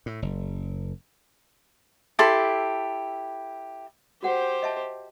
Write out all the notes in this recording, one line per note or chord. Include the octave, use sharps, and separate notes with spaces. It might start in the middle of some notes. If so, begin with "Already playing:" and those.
A2
F#1
E4 G4 A4 C6
F#4 G4 C5 F#5 G5
D#5 E5 A5